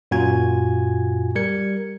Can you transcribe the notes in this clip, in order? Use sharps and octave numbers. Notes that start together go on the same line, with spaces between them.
F#2 A#2 F4 F#4 G#5 G#6
G3 A#4 G#6 C#7